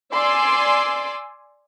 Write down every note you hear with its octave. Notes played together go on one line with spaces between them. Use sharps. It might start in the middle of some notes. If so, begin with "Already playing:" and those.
D5 G#5 C6 D6 E6